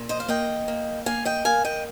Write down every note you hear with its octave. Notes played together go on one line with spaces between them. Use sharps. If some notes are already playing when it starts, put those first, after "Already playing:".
Already playing: A#2
C5 D#5
F5
A#3 D#5 G5
A#3
A#3 F5 G#5
D#5 G5
A#3 F5 G#5
D#5 G5